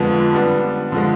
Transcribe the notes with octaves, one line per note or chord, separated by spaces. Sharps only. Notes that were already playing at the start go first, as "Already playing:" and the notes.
Already playing: F2 D3 F3 G#3 B3
G3 B3 D4
D3 F3 G#3